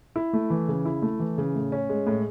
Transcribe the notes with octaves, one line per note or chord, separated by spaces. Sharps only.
E4
A3
E3
C#3
E4
A3
E3
C#3
A2
C#4
G#3
A2